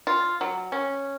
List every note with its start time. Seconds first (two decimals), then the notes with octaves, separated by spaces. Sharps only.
0.07 F4
0.41 F#3
0.72 C#4